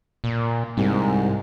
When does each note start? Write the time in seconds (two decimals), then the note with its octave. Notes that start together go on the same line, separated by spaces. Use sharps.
0.24 A#2
0.77 C2 G#2